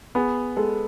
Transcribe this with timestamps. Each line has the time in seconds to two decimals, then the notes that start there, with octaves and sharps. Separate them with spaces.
0.15 B3 G#4
0.57 G#3 A4